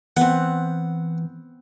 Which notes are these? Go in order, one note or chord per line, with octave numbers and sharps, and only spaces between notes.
E3 B3 C4 F#5